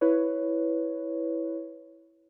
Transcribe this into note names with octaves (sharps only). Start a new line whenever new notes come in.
E4 B4 C#5